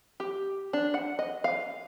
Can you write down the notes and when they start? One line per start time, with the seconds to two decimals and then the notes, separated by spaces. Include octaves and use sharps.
0.20 G4
0.73 D4
0.94 F#5
1.19 D#5
1.44 F5